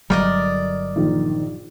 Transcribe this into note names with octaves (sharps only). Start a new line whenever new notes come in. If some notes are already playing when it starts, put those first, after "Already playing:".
G1 F#3 G3 A#4 D5 D#5
A#1 D#3